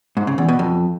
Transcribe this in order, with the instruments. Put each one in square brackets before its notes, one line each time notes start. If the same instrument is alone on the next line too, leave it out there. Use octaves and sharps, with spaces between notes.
[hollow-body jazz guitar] G#2
C#3
E2
B2
F2